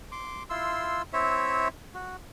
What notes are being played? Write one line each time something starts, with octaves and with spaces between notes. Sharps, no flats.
C6 D6
E4 F4 C6 E6
C4 E4 C#5 E5
F#4